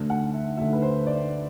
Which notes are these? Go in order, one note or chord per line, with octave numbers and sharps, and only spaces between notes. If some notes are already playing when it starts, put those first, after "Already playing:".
Already playing: D2 D3
F#5
E5
D2 D3 E5
B4
C5
D5